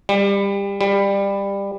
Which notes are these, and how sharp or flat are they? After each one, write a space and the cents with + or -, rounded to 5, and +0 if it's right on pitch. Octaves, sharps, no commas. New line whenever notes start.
G3 +25
G3 +20